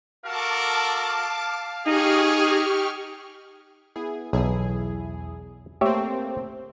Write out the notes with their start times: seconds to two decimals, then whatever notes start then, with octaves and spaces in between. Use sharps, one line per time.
0.24 F#4 A4 A#4 F5 A5 D6
1.86 D#4 G4 G#4 C#6 F6
3.96 B3 E4 G#4
4.33 B1 E2 E4 G#4
5.81 A3 A#3 C4 G4 C#5 E5